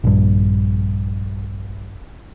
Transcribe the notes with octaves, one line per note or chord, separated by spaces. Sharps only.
A#1 G2